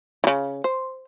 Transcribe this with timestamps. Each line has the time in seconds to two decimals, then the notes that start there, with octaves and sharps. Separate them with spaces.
0.24 C#3 E3
0.64 C5